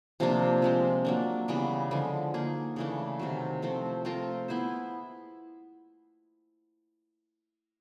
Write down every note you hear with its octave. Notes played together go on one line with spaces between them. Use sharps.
C3 F3 A#3 D4
F3 G#3 C4
F#3 A#3 D4
C#3 E3 G3 B3
D3 F3 G#3
A#3 D#4 G#4
C#3 E3 A3 D4
C3 D#3 F#3
F3 A3 C4
A3 C4 F4 A#4
B3 E4 G#4 C5